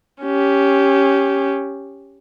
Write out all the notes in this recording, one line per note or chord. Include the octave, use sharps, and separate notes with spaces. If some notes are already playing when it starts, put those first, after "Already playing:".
C#4 G4